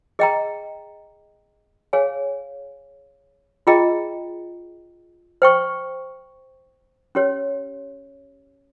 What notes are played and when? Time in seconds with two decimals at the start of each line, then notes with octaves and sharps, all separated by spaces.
0.19 G#4 D#5 G5 A#5
1.93 G#4 C#5 F5 G#5
3.67 F4 G#4 D#5 G5 A#5
5.42 C5 G5 C#6
7.15 C#4 G4 C#5